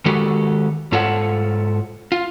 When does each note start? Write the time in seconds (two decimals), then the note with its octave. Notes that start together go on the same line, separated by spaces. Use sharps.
0.06 D#3 G#3 F#4 G4 A4
0.92 G#2 F4 A4 C#5 F#5
2.12 F4